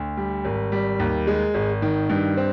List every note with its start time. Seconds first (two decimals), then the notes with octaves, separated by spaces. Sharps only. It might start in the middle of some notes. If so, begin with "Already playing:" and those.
Already playing: D2
0.17 G3
0.45 G#1
0.72 G3
0.99 D#2
1.27 G#3
1.54 G#1
1.82 D#3
2.09 G2
2.37 C4